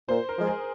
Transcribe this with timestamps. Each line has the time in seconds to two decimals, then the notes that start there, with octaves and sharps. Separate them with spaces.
0.08 A#2 C5
0.29 A#4
0.38 F3 G#3
0.47 G#4